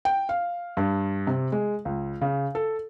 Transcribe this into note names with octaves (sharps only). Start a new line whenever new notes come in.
G5
F5
G2
C3
G#3
C#2
C#3
A4